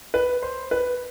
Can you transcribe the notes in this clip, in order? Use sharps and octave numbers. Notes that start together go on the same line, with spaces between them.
B4
C5
B4